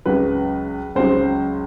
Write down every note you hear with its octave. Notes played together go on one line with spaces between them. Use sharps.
C#2 C#3 F#3 B4
C#2 C#3 F#3 C5